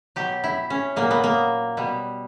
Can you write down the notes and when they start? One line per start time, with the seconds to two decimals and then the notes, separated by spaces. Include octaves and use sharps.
0.16 B2 F#3 G4
0.44 E4
0.70 C#4
0.96 A#2 F#3 A#3
1.11 B3
1.24 A#3
1.77 B2 G3